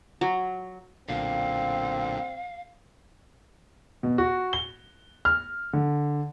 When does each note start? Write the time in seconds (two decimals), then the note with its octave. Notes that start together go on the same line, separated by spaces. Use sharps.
0.21 F#3
1.08 B1 A#2 D3 C4 F5
4.03 B2
4.18 F#4
4.53 G7
5.25 F6
5.73 D3